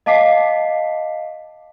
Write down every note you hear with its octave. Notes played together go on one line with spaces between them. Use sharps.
D#5 F5 A5 D6 B6 C7